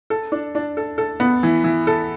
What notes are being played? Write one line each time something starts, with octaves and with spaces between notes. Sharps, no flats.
A4
D4
D4
A4
A4
B3
E3
E3
A4